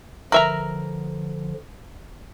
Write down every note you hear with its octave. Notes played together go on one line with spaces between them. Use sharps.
D3 F3 A#4 B4 E5 A#5